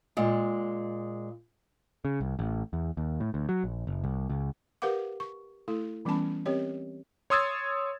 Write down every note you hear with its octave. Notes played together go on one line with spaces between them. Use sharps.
A#2 G#3
C#3
C2
A1
E2
D#2
A2
D2
F#3
A#1
F#1
C2
C#2
G4 A#4 B4 F5 F#5 D6
C#6
A3 E4 A4
E3 G3 B3 C#4 A5 B5
C4 G4 A#4 C#5 D#5
C#5 C6 D#6 E6 G#6 A6